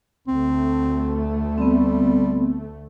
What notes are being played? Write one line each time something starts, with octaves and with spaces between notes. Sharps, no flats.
D2 A3 C4
G3 B3 C4